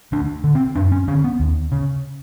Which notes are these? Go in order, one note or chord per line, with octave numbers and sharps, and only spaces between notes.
D2 D4
D3
C4
F#2 D4
C#4
D3 C#4
B3
D#2
C#3